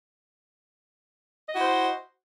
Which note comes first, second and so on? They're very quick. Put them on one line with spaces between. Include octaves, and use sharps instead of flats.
D#5 F#4 E4 C5